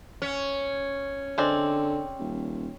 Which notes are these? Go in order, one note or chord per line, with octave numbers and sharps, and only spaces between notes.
C#4
D3 G#3 C4 D5
D#1